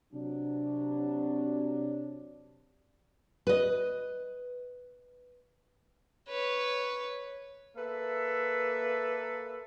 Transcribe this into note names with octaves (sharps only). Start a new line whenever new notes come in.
C3 F#3 D4
B4 D#5
B4 C#5
A#3 A4 B4 E5